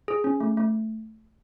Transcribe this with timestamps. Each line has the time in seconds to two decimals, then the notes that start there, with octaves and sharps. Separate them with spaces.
0.08 G#4
0.24 C#4
0.40 A3
0.57 A3